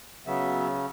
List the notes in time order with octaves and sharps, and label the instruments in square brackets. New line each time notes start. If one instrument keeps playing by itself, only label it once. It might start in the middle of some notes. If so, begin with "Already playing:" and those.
[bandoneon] C#3 [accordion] F#3 B3 E5